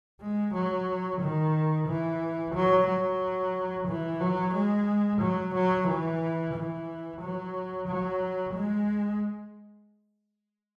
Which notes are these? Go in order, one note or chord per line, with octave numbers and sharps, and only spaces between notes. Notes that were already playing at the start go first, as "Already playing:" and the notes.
G#3
F#3
D#3
E3
F#3
F#3
E3
F#3
G#3
F#3
F#3
E3
E3
F#3
F#3
G#3